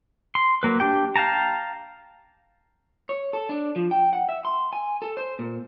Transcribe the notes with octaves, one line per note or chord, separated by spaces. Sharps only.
C6
F#3 A#3 B4
D4 G4 G5
F5 G5 A5 A#5
C#5
A4
D4
F3
G5
F#5
E5
C6
G#5
A4
C5
A#2